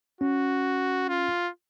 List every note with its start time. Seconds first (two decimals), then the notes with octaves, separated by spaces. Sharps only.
0.21 C#4 F#4
1.09 F4